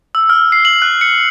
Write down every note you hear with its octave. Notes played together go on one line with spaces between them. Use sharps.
E6
F6
C7
F#7
F#6
C#7